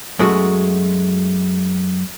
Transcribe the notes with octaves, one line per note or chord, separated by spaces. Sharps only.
F#2 G#3 A3 F#4